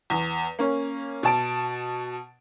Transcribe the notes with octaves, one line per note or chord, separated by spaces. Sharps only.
E2
A#3 C#4
B2 A5 D7